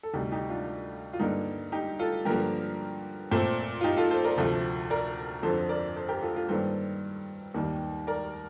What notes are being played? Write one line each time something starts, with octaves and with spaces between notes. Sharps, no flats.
A4
D2 C3 G3 D#4 G4
D#4 G4
D4 F4
F4
G2 D3 G3 A#3 D#4
D#4 G4
F4 A4
G2 D3 F3 A#3 G4 A#4
A#2 A3 C4 A4 C5
F4
D#4 G4
F4 A4
A4 C5
A#4 D5
D2 C3 F3 A3 A4 C5
A#4 D5
F2 D3 F3 A4 C5
A#4 D5
A4 C5
G4 A#4
F4 A4
F4 A4
G2 D#3 G3 A#3 A4 C5
D#2 D#3 G3 A#3
A#4 D5